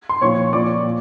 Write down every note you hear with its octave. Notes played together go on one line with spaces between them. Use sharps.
C6
A#2 F3 C#5 C#6
A#2 F3 D5 D6
A#2